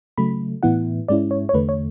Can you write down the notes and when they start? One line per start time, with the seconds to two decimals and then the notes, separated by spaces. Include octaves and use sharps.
0.18 C#3 F#3 A3 B5
0.63 A2 E3 B3 E4 F#5
1.08 G#2 G#3 C#4 E4 D5
1.31 C#5
1.49 C#5
1.54 E2 D3 A3 B4
1.69 C#5